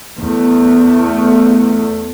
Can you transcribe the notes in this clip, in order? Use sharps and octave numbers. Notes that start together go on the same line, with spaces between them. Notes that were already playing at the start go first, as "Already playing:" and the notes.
E2 A3